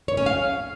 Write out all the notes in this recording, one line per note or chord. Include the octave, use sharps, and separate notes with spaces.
C#5
C#4
F5